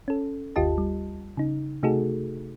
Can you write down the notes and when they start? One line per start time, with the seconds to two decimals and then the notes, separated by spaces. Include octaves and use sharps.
0.08 C#4 A4
0.56 G1 D#2 F4 G4 D#5 A5
0.78 G3
1.37 C#3 D#4
1.83 C3 A3 D#4 F#4 G#4 A4